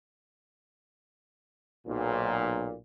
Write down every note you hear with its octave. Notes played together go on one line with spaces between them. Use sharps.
B1 A#2